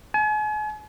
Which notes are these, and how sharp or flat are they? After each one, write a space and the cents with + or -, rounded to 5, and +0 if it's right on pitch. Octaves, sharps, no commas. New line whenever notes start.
G#5 +40